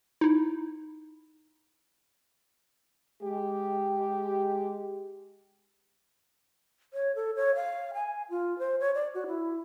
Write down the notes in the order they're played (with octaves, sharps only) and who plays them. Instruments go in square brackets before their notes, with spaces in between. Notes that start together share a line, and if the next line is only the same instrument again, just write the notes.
[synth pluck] D#4 E4
[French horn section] G#3 G4
[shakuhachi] C#5
A4
C#5
F5
G#5
F4
C5
C#5
D5
F#4
E4